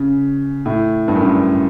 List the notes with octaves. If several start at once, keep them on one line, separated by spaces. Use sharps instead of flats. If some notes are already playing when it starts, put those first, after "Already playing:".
Already playing: C#3
A2
G2
F#2
G2